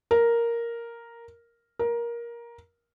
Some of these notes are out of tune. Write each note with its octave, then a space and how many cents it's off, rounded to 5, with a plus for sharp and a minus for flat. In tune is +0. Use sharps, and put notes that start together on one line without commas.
A#4 +0
A#4 +15